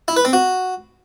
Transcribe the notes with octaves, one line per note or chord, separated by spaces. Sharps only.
E4
B4
C4
F#4